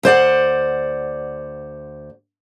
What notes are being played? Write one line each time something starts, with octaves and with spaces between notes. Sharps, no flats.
D2 C5 D5 F#5